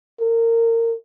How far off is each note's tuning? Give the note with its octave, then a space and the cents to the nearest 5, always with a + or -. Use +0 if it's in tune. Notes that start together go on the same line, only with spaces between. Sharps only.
A#4 -25